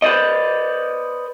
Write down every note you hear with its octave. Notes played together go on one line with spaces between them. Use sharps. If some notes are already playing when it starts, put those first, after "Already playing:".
B4 C5 D5 D#5